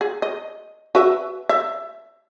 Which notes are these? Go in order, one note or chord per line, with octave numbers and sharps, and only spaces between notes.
G#4
D#5
F#4 B4 E5
E5